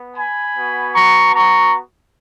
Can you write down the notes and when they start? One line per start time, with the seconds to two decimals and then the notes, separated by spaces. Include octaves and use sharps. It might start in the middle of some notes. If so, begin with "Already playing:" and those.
Already playing: B3
0.17 G#5 B5
0.56 B3 F#4
0.94 A#5 C#6
1.34 A#5 C#6